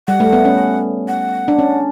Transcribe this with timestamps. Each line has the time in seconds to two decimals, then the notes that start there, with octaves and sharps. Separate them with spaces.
0.08 G3 F#5
0.20 A3
0.33 B3
0.45 C#4
1.08 F#5
1.48 D4
1.59 C#4